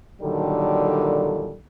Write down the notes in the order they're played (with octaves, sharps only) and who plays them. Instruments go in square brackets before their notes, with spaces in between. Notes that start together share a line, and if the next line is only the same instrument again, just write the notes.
[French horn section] A#2 D3 D#3 F#3 G3 A4